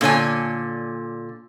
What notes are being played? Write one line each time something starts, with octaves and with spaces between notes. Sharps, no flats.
A#2 D3 C#5 G#5